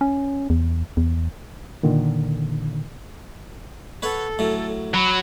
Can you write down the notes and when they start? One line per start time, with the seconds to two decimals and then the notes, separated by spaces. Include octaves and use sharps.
0.01 C#4
0.50 E2
0.97 E2
1.83 A#2 D3 D#3
4.02 A4 B4 C#5 F#5
4.39 A2 F#3
4.94 F#3 B5